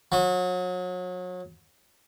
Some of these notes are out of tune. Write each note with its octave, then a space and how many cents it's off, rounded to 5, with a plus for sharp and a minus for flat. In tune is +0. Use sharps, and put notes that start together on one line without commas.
F#3 -35